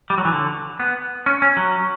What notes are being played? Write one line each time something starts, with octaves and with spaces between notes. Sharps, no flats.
G3
F#3
E3
D3
B3
C#4
C#4
F#3